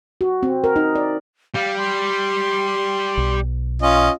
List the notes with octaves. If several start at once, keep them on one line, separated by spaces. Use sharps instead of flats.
F#4
C4
A#4
D#4
D5
G3 F5
C6
B1
C#4 F4 D#5